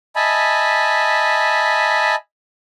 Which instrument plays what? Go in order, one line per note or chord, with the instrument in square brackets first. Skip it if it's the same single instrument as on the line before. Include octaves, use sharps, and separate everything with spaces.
[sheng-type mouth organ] D#5 E5 G#5 A5 B5